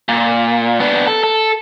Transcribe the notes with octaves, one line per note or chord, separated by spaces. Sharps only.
A#2
B3 D4
A4
A4